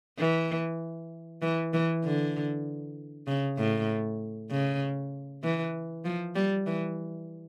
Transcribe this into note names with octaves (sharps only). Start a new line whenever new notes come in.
E3
E3
E3
D3
C#3
A2
C#3
E3
F3
G3
E3